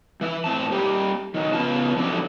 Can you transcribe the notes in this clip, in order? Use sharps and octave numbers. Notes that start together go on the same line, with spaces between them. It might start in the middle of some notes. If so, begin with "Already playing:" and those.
E3 E5
A2 C4 A5
G3 A#3 G4
D#3 F#3
C#3 B3 F4 A5
F2 D3 F#3 E4